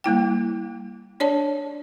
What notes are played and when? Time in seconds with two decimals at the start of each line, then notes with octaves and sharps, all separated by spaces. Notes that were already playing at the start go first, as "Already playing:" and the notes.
0.04 G3 A#3 E4 G5
1.20 D4 C#5 D5 A5